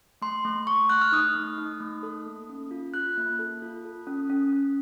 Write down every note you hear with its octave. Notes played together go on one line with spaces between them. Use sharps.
A3 C6
A3
A3 C#6
A3 F#6
F6
D#4 D#6
A3
D#4
A3
A4
A#3
C#4
F4
F4 F#6
A#3
A4
F4
A4
C#4
C#4
C#4